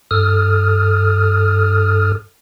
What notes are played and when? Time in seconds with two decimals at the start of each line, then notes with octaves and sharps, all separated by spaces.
0.11 G2 A4 D#6 F6